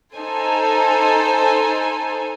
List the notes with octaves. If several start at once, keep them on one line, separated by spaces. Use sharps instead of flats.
D#4 A4 C5 G#5